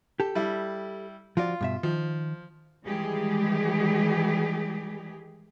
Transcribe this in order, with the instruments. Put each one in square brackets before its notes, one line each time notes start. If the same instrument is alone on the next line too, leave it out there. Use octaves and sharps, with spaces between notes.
[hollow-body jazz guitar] G4 A4
[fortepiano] G3 E4
[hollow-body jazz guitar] F3 F#4 D5 [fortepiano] F4
[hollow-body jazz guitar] G2 B2 E5
[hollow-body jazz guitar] D#3 [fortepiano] F3
[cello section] D#3 E3 G3 G#3 G4 G#4